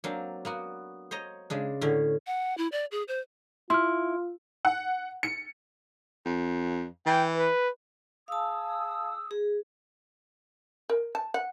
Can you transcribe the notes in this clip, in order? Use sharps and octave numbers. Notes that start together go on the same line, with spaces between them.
F#3 A#3 C4 D4 F5
A#3 B3 F#4
C5 C#5 D#5 A#5
C#3 G#3 D4
A2 D3 C#4
F#5
E4
D5
G#4
C5
E4 F4 C6 F6
F#5
C#7
F2
E3 G5
B4
G#4 F5 A5 D#6 E6
G#4
A#4
A5
F#5